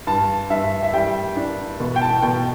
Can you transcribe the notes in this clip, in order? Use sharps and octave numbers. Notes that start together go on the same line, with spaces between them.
G2 A5
G2 E5
E5
G3 G5
D4
B2
G5
A5
B2 G5